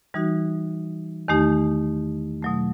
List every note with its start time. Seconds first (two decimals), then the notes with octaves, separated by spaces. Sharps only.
0.14 E3 G3 D#4 F#4
1.28 E2 D#3 A3 D#4 G4
2.43 B2 F#3 A3